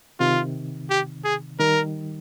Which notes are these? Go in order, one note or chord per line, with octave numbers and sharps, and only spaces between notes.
C3 D#3 F4
G4
G#4
D#3 G3 A#4